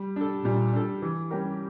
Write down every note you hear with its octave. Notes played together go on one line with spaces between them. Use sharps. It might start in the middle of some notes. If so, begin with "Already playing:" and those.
Already playing: G3
D4 A4
A#2 G3
D4 A4
E3
G3 C#4 G4 A#4